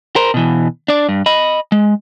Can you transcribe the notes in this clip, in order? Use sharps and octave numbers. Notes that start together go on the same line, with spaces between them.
A#4 C5
B2 E3
D4 D5
G2
D#5 B5
G#3